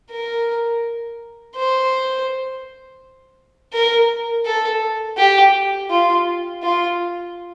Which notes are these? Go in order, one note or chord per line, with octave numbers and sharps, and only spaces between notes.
A#4
C5
A#4
A4
G4
F4
F4